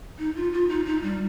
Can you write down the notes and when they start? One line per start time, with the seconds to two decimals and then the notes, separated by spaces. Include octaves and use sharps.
0.19 D#4
0.36 F4
0.53 F4
0.69 D#4
0.86 D#4
1.03 G3